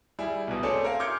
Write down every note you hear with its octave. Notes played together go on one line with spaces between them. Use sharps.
G3 E4 G#4
B1 B2
A3 C4 C#4 G#4 A4 D5
A#4 F5
C6 D6 F6 G6 G#6 C#7